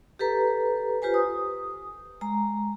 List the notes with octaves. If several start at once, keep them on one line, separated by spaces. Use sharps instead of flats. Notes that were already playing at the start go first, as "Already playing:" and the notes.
G4 A4 B4 A#5
F4 G4 B4 C5 G#5
D#6
G#3 A#5